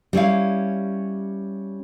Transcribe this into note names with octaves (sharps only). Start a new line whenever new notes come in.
G3 C#4 E4 F5